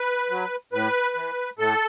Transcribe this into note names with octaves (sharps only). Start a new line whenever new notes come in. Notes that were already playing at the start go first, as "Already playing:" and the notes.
Already playing: B4
F#3
A2 B4
E3
A2 A4